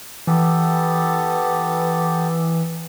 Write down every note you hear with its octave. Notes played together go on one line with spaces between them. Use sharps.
E3 B3 G4 A4